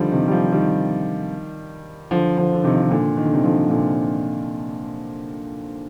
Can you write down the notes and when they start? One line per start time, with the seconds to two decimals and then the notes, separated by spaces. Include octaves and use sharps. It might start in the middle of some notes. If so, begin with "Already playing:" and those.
Already playing: D3 D#3 F3 G3
0.12 C3 D#3
0.28 G3
0.32 D3 F3
0.52 D#3 G3
2.11 D3 F3
2.37 D3 F3
2.53 D3
2.64 C3 D#3
2.75 F3
2.83 D#3
2.91 A#2 D3
3.17 D#3
3.25 D3
3.33 C3 D#3
3.44 D3 F3
3.70 A#2 D3